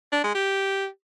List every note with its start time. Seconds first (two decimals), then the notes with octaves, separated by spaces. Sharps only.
0.13 D4
0.24 G#3
0.35 G4